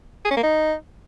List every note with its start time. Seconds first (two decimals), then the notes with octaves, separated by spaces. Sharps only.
0.25 G#4
0.31 C#4
0.37 A#3
0.43 D#4